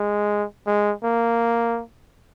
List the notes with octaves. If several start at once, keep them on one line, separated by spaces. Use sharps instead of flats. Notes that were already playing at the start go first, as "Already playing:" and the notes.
Already playing: G#3
G#3
A#3